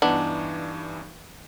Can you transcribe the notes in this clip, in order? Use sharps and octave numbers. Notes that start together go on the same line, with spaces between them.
G2 E3 B3 D4 D#4